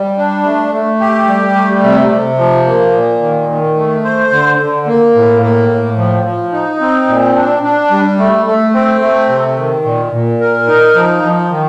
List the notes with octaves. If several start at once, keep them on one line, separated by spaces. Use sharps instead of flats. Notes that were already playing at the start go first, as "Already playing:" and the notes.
Already playing: G3
D4
A3
A3
G4
G3
A3
C3
C3
F3
A#3
A#2
D#3
D#3
A3
C5
D3
D3
A#3
A2
A#3
A2
F3
F3
D#4
C4
A#2
D4
D4
G3
A3
A3
C4
A3
C3
D#3
A#2
A#2
A#4
D#4
F3
F3
D#3